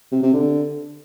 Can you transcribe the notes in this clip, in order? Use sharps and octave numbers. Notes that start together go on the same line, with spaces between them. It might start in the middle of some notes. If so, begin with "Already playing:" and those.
C3
C3
D3